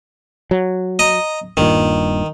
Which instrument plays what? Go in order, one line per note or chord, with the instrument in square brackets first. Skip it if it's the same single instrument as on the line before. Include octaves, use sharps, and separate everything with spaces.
[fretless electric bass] F#3
[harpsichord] D#5 A#5
[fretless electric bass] D#1 G2 A#2 [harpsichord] D#3